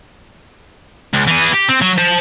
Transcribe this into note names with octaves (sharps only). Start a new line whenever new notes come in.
C#2
E3 G#4
G4
C4
F#3
C5 A5